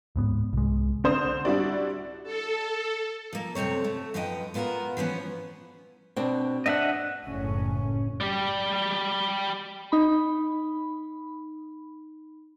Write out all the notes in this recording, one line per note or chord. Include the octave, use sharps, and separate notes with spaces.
D1 G#2 B3
C2 G#3
D3 C5 D#6
G3 D4 E4 F#4 D5
A4
F3 A#3
F#2 C3 A3 C4 C#5
A3
F#2 F3 C#4 B4 D#5 G5
A#2 B3 F4 F#4 A#4
E3 F3 B3 C#4
B2 C4 D4
B3 D4 D#5 E5 F#5
F#1 A2 C#4
G3 G4
D#4 B5